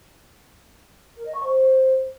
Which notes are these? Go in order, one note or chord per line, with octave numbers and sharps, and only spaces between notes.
A#4
D#5
C#6
C5